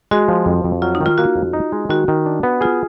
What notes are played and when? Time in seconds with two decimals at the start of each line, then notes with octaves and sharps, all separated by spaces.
0.11 G#3 F#4
0.28 F3
0.46 F2
0.64 F2
0.82 F#3 F4
0.95 D#4
1.01 D#3
1.06 F4
1.18 A#3 F#4
1.36 F2
1.53 D#4
1.72 G#3
1.89 D#3 F#4
2.08 D#3
2.26 D4
2.43 B3
2.61 F4 G#4